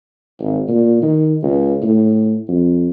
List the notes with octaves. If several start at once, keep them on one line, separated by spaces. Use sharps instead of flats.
G#1
A#2
D#3
C#2
A2
F2